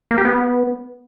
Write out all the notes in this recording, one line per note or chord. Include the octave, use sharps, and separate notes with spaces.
A#3
G4
B3